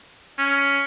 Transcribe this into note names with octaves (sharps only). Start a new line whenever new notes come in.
C#4